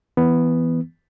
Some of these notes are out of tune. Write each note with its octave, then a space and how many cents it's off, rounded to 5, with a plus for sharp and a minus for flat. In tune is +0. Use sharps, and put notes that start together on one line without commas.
E3 +0 B3 +5